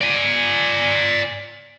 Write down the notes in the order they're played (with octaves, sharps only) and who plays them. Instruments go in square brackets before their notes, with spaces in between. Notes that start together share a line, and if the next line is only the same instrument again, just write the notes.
[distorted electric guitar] D5 G#5